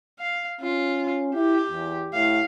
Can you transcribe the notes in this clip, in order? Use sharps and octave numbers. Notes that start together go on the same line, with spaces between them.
F5
C#4 F4
E4 G4
E2
A2 F5